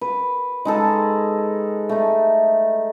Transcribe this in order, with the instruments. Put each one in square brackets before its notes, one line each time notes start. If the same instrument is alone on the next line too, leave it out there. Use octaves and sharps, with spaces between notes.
[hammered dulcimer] B4
G#3 D#4 A4
A3 D#4